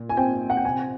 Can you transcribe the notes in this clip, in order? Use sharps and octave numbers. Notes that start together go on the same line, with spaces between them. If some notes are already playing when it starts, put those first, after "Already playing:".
Already playing: A#2
G#5
C4 G5
F#5
G5
C3 G#5